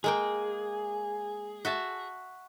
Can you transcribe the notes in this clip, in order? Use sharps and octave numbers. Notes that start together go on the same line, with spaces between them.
G#3 A#3 G#4 G5
F#4 E5 A5